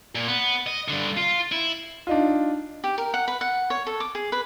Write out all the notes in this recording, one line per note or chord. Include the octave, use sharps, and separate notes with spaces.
A#2
B3
D#5
G2 D3
F4
E4
D4 D#4 F4
G4
A#4
F#5
B4
F#5
C#5
A4
D6
G#4
B4